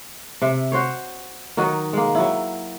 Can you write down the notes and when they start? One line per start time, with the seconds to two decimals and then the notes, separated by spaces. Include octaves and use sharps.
0.42 C3 E5
0.72 F#4 C5 C#5
1.57 D#3 F#3 F#4 D#5
1.93 G#3 A#3
2.15 F#3 E4